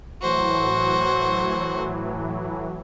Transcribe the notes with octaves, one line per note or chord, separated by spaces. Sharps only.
A2 E3 F#3 F#4 C5